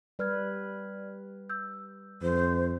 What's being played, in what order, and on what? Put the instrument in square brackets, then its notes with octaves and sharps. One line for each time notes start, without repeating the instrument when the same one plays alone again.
[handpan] G3 B4 [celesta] D5 F6 G#6
[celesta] E6 G6
[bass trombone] F2 [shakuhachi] C5